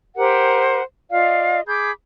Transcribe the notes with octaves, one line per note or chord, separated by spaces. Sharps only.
G4 A#4 C5 F#5
F4 D5 D#5 F5
G#4 B5 D6 G6